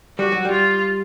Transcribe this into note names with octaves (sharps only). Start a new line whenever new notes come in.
G3 F#4
F#3
G3
F4